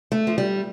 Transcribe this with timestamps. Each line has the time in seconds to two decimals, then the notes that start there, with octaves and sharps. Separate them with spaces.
0.12 A3
0.27 F3
0.38 G3